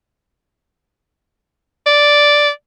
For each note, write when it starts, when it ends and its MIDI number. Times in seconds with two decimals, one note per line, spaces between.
1.86 2.50 74